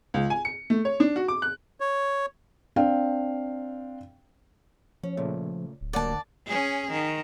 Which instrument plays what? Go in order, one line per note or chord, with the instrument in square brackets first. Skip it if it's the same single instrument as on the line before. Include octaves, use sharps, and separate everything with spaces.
[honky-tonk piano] C#2
G#5
C#7
A3
C#5
D4
F#4
D6
F#6
[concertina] C#5
[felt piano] C4 D4 F5 G5
[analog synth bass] F3 [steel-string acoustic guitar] C#4
[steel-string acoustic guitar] A#2 [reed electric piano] C#3 A3
[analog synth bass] D1
[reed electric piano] D2 F#5 A6 [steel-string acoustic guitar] F#3 G3 A#3 [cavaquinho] D5 A5
[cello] C#4 G#4
D#3